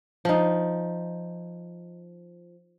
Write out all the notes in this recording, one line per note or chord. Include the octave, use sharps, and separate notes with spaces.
F3 D#4